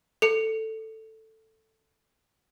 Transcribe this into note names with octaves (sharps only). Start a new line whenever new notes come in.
A4 C#7